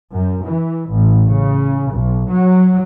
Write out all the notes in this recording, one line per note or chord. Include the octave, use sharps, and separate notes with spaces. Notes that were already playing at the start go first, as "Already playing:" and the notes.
F#2
E3
A1
C#3
B1
F#3